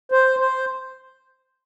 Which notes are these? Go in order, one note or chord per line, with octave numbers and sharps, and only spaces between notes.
C5
C5